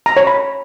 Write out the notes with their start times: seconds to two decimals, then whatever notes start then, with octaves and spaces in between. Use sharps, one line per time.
0.06 A#5
0.17 C#5
0.27 B5